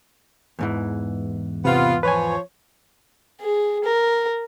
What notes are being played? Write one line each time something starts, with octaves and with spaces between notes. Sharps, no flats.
E2 G#2 E3
C3 B3 F4
F3 B4 C#5 G#5
G#4
A#4